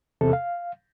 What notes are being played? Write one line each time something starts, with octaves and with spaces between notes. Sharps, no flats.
E2 C3 A4
F5